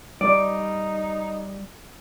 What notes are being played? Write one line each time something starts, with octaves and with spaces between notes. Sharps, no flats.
G3 D#4 D5